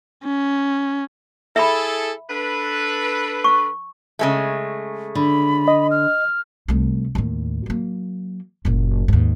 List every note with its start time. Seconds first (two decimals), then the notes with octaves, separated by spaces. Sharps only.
0.24 C#4
1.56 E4 G#4 A4 E5 B5
2.30 D4 A4 B4
3.44 C#6
4.19 C#3 G#3 A3
5.15 D3 B5
5.68 D#5
5.91 F6
6.68 C2 A3
7.15 D#2 A2
7.66 F#3 A#3
8.65 F#1 A#2
9.08 D#2 G#2